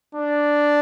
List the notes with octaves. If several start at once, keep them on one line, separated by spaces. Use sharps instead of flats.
D4